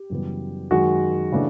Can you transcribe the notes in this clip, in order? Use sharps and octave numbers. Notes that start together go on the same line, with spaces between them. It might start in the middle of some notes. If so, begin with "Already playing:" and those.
Already playing: G4
F#2 C#3 E3 G3 B3
F#2 D#3 G#3 F#4
C#3 E3 A3 D4